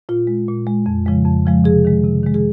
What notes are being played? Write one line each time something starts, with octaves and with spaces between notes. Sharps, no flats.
A#2 F4
G#3
A#2
G#3
F2
C#3 F3 G#3
F2
C#3 F3 G#3
C3 G#4
D#3 G#3
C3
D#3 G#3
G#4